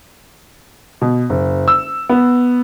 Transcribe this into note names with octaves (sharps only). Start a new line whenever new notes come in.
B2
F#1
E6
B3